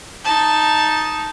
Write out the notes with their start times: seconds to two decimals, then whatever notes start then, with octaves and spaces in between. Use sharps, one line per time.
0.25 D#4 A5